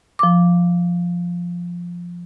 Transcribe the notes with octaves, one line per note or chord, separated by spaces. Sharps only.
F3 D6